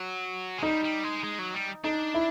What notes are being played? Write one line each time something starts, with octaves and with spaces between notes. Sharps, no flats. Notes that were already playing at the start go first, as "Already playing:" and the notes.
Already playing: F#3
G#3
G3 D#4
G3
G#3
G#3
F#3
G3
D4 D#4
E4